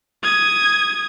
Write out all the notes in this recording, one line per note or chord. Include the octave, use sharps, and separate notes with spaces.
D#6 G#6